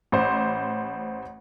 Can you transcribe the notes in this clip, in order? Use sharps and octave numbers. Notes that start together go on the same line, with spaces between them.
A1 C5